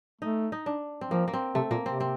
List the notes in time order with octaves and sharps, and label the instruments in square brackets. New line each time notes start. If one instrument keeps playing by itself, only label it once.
[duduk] A3 [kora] D#4
[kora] D#4
D4
C4
[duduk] F3 [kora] A#3
[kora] A#3
C4
[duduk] C3 [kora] A3
[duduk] A#2 [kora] A#3
[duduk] C3 [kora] C4
[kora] C4